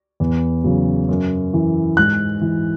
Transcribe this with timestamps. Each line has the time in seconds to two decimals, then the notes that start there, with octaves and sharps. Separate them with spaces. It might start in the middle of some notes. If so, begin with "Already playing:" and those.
0.20 E2
0.64 C#3 F#3
1.09 F#2
1.54 E3
1.97 G#2 F#6
2.41 E3